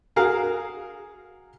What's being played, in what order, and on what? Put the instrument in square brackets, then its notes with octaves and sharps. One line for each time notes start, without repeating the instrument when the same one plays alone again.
[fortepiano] F#4 G#4 A#4 F5